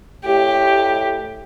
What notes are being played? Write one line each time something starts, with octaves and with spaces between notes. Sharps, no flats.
A2 G4